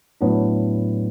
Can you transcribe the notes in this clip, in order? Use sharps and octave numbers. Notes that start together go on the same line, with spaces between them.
A2 F#3 B3 D4